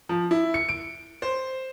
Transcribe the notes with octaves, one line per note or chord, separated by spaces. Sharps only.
F3
E4
C#7
D7
C5